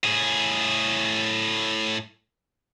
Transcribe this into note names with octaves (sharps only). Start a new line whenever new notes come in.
A2 G#4